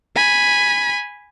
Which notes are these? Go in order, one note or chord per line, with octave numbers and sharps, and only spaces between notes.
G#5 B5